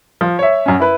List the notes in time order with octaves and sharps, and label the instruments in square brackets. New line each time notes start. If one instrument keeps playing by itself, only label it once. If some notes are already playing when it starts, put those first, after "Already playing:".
[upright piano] F3
C#5 E5
F#2 C#4
E4 B4